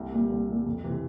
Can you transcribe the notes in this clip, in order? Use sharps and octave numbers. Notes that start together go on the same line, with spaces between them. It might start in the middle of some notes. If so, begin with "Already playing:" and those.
Already playing: C2
A#2 G3
C2
A#2 G3
F2
C3 E3